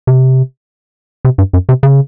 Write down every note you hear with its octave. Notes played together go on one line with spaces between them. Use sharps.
C3
C3
G2
F#2
C3
C#3